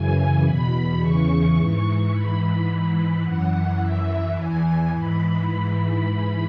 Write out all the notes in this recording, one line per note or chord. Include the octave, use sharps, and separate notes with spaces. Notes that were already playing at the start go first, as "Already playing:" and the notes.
Already playing: F#2 C#3 E3 G#5
E2 B2 B5
E2 C#3 E3 C#6
G#2 E3
G#2 E3 B5
G#2 E3
F#2 E3 F#5
F#2 E3 E5
E2 E3 G#5
G#2 E3 B5
G#2 E3 B5
G#2 E3